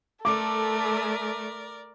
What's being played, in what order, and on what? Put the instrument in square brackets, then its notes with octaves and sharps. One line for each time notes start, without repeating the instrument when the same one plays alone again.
[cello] A3 [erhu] A4 [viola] A#4 D5 [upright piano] D6